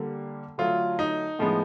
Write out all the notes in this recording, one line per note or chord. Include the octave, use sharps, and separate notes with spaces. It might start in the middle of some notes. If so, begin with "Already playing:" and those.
Already playing: D3 G3 A#3
D3 F#3 A3 F4
D#4
A2 F3 G#3 B3